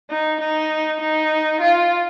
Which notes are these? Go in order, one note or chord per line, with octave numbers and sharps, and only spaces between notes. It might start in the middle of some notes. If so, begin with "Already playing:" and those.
D#4
D#4
D#4
F4